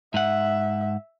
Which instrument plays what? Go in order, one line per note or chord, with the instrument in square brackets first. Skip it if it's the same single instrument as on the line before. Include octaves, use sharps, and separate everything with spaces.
[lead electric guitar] G#2 F#5 [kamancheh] E5